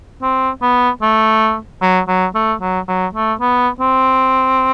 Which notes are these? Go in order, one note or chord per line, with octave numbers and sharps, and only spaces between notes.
C4
B3
A3
F#3
F#3
A3
F#3
F#3
A3
B3
C4